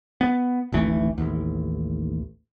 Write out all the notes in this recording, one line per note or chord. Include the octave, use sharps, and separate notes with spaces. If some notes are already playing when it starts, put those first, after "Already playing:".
B3
D1 G#1 E3 A3
A1 D#2